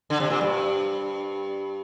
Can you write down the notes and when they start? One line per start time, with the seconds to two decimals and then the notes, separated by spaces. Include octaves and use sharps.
0.10 D3
0.20 C3
0.30 A#2
0.41 G2